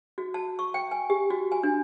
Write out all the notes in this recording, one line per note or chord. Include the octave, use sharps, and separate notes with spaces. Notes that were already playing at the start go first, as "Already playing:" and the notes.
F#4
A5
C#6
G5
G#5
G4
F#4
G#5
D4